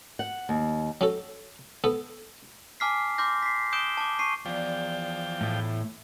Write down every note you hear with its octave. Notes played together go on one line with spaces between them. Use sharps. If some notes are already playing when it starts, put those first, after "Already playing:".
F#5
D#2
F#3 C#4 A4
B3 A4
G#5 A5 D6 F6 B6 C7
C6 D6 F6 G6 A#6
B6 C7
D#6 G6 D7 E7 G7
A5 D6
C#6 C7 D#7
E2 F3 D4 G5
A2